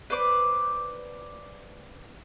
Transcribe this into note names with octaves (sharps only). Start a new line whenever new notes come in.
B4 C5 D5 D6